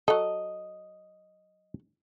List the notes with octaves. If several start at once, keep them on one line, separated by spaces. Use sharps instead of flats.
F#3 A4 D#5